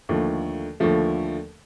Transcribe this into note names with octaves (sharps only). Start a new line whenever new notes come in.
D#2 D3 F3 A3
D#2 D3 F3 A3